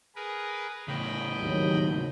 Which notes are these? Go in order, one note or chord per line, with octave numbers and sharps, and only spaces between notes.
G#4 A#4 B4
A2 C#3 D#5 G5 B5
G#1 D#2 F#3